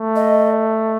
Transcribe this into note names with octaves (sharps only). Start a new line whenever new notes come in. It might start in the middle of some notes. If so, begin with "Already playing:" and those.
Already playing: A3
D#5